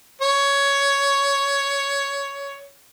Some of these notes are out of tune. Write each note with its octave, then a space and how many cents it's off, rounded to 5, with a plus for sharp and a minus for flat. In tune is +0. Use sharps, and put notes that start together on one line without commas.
C#5 +10